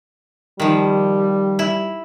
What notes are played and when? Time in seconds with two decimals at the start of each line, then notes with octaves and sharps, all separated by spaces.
0.60 D#3 F3 G3
1.59 E4